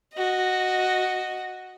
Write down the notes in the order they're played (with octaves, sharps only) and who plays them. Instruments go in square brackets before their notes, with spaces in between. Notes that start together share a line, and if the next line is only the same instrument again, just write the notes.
[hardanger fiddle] F#4 D#5